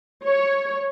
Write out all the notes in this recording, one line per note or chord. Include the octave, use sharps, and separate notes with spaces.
C#5